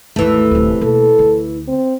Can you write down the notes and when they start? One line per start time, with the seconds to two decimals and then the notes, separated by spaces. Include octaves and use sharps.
0.16 G#1 D#2 E3 A3
0.51 D1 C3 D#3
0.81 B2 A#3 A4
1.19 D2 C#3
1.68 C4